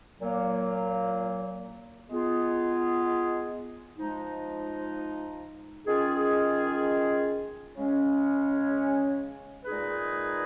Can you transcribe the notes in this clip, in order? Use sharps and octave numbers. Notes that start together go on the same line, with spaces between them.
A#2 F#3 A#3
G#3 B3 F4 G#4
F3 G#3 D#4
D#3 G#3 C#4 F4 G#4
C#3 G#3 C#4
A#2 G#3 D#4 G#4 B4